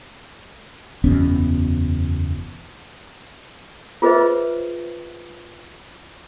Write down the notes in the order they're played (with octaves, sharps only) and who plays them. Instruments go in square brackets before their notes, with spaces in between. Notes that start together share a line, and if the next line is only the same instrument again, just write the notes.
[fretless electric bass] F#1 E2 B2 C#4
[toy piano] F4 G#4 B4 C5 D#5 E5